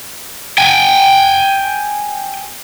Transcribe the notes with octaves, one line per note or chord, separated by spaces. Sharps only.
G5 G#5